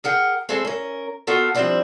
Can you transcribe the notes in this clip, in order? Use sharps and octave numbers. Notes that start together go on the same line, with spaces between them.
G#4 A#4 F#5 G5
G#3 C4 E4 G#4 A4
C#4 A#4
B3 F4 F#4 A4 A#4
F3 G3 A#3 C4 D4 E4